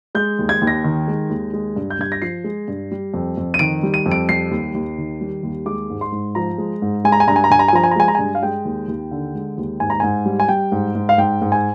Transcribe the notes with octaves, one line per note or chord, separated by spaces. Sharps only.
G#3 G6
D#2
G#6
D#2
A#6
D#3
G#3
D#2
G#3
G2
G6
G2 G#6
A#6
F3 C7
G#3
G2
G3
F2
F2
D#7
D#3 D7
G3
D#7
F2
D7
G3 C7
D#2
D#2
D#3
G3
D#2
G#3 D6
G#2
C6
G#2
F3 A#5
G#3
G#2
G#3 G#5
A#5
G#5
G2 A#5
G#5
A#5
G2 G#5
A#5
G#5
F3 A#5
G#5
A#5
G#3 G#5
A#5
G2 G#5
F5
G#3 G5
D#2
D#2
D3
G#3
D#2
G#2 G#5
A#5
G#2 G#5
G3
G#5
G3 G5
G#2
G#2
F5
G#2 G5
G#2
G#5